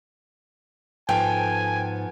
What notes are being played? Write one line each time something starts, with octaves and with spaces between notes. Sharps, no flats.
G#2 F3 B3 A4 G5 G#5